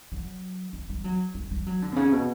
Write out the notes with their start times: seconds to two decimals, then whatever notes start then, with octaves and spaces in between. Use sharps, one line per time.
0.12 F#3
0.73 G3
0.89 G3
1.04 F#3
1.35 G3
1.51 G3
1.67 F#3
1.82 D3
1.92 B2
1.96 C#3
2.12 B2